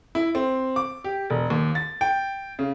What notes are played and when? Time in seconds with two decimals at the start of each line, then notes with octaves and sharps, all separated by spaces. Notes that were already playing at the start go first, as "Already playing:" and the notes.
0.15 E4
0.35 C4
0.76 D6
1.04 G4
1.30 E1
1.50 D#2
1.75 A6
2.01 G5
2.59 C#3